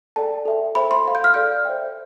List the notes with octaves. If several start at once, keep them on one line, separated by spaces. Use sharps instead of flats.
A4 D5 G5 A5
A4 E5 G5
A4 C5 E5 G5 B5
C6
C5 F5
G6
F6
A4 D5 F5 G6
C5 E5 G5